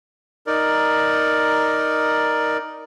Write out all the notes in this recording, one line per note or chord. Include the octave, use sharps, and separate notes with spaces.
D#4 A#4 D5